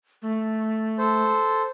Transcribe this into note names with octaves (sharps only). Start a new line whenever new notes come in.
A3
A4 C5